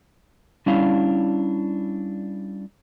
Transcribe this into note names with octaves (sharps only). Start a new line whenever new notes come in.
G3 C#4 D4 E4 F5